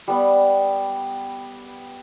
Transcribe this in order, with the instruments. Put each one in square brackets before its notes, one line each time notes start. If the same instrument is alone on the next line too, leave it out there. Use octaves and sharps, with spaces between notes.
[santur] G3 B3